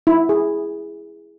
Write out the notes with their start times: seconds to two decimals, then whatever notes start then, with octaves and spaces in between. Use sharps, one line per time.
0.07 E4
0.29 G#4